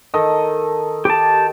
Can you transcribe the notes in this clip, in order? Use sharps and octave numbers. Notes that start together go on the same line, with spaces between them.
D#3 A4 D#5
G4 A5